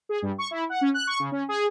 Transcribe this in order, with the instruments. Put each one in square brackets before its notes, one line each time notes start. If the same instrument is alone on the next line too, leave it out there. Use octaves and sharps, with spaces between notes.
[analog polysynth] G#4
G2
C#6
E4
F#5
C#4
F#6
C#6
C#3
C#4
G#4